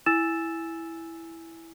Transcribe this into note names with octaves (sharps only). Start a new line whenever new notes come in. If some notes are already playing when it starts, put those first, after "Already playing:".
E4 G#5 E6 A6 E7